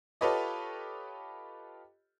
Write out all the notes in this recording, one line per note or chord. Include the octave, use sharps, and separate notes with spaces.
F4 G4 A4 B4 C#5 D#5